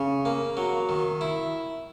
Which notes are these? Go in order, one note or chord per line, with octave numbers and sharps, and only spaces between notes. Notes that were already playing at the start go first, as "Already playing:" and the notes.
Already playing: C#3
A#3
F#3
D#3
E4